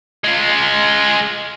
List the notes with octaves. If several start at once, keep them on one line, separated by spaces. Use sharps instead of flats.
G#3 F4